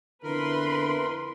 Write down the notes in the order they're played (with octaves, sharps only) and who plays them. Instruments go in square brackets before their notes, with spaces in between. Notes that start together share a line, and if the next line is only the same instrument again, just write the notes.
[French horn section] F2 B3 E4 [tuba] D3 [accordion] A#4 [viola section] B4 B5 C6